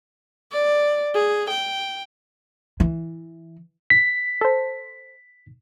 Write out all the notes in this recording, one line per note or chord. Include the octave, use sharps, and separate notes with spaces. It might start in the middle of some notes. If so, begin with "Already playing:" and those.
D5
G#4
G5
E3
B6
A4 C5